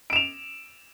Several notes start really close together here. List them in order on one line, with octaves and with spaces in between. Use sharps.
D7 E7 F7